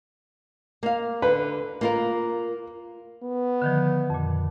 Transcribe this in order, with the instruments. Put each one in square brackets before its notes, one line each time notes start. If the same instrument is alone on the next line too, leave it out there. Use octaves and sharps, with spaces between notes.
[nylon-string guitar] A#3 F5
[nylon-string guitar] D3 [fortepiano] B4
[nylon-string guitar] A#3 F4 A#4
[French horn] B3
[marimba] D3 D#3 F3
F2 A#2